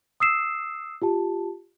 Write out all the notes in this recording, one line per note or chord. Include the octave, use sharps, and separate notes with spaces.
D#6 E6 C7 E7
F4 G4 A5